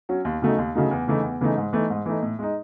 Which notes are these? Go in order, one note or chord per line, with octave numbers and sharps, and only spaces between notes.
F#3 C#4
D#2
C#3 F#3 A3 D#4
D#2
C#3 F#3 A3 D#4
E2
C#3 E3 A3 D#4
E2
C#3 E3 A3 D#4
G#2
E3 A3 D#4
G#2
E3 A3 D#4
A2
G#3 D#4